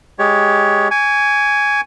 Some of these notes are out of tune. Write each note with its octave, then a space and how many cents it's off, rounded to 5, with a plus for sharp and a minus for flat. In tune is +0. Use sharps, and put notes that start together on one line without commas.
G#3 +0 G4 +0 C#5 +15
G#5 +0 C#6 +40